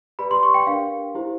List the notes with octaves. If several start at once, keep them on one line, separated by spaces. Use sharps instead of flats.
G4 B4 D5 B5
C6
C#6
G5
D4 G4 A#4 F5
E4 G4 C5